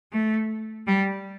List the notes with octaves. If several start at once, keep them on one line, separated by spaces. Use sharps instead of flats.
A3
G3